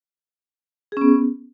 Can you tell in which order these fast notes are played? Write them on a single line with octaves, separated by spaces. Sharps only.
G#4 C#4 B3